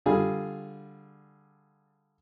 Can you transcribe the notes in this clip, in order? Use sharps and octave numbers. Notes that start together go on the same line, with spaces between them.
D3 G3 F4 G#4